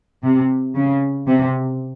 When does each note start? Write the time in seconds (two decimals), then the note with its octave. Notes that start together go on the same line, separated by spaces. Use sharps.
0.23 C3
0.76 C#3
1.28 C3